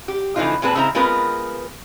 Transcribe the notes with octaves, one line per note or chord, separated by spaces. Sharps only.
G4
C#3 E3 F3 A3 D#4 F4
A#2 G#3 C4 G#4 B4 A5
C#3 G#3 C4 E4 A#5
G#3 B3 C4 F4 A#4 B4